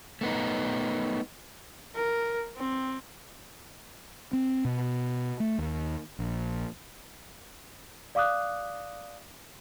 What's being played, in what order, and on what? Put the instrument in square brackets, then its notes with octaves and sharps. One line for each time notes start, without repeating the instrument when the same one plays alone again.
[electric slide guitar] A3 B3 D#4
[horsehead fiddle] A#4
C4
[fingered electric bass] C4
B2
A3
D#2
A#1
[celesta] D5 F5 D6 D#6 F#6